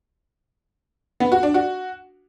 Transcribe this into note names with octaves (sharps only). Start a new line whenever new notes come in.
B3
F#4
D4
F#4